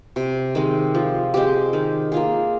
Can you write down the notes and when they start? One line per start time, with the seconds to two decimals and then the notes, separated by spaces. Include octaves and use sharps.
0.16 C3
0.55 D#3 G#3 C4
0.94 F3
1.34 G#3 C4 G4
1.73 D#3
2.12 A#3 F4 G#4